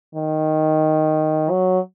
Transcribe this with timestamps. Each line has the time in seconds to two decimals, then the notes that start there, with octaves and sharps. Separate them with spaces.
0.15 D#3
1.50 F#3